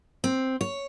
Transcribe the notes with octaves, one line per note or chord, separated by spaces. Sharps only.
C4
C#5